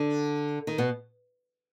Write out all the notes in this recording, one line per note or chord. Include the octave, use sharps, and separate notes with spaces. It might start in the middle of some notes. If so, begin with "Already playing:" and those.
Already playing: D3
D#3
B2 B3